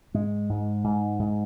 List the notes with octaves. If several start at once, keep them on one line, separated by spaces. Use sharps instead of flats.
G#2 G#3
G#2
G#2
G#2